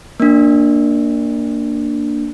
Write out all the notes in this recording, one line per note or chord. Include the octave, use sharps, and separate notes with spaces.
A#3 D4